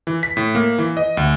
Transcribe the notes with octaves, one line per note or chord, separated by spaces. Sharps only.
E3
B6
A2
A#3
E3
D#5
D2